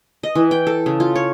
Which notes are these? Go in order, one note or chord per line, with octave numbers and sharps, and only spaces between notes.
D#5
E3
G5
A4
C#3
F4
C#5